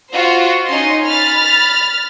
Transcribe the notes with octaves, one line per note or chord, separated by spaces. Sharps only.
F4 F#4 C5
C#4 D#4 D#5 C6
B5 F6 A6